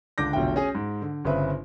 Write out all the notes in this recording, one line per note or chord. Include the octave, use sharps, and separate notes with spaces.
C#2 D3 D4 D6 G6 A#6
F1 B1 D3 E5 G5
C#4 G#4
G#2
D3
G1 C#3 C4 B4 E5